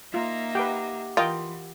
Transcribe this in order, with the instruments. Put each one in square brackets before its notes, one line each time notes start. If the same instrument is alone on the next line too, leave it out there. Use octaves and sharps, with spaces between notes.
[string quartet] A#3 D#4 E5 [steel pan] F4
[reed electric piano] G4 F#5 D6 [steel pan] B4 G5
[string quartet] E3 [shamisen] F4 [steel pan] A#4 D#5 G5